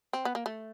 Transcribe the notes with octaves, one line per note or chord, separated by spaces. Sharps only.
C4
B3
A#3
A3